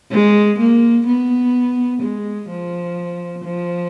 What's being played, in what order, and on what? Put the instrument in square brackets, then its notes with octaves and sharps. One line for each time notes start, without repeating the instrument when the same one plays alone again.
[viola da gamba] G#3
A#3
B3
G#3
F3
F3